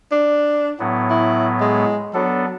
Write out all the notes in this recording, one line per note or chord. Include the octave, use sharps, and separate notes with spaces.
D4
A2 F#3 B3
E4
G#3
F#3 B3 D4 A4